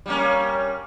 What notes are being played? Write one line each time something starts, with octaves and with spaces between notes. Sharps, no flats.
G3 A#3 C#4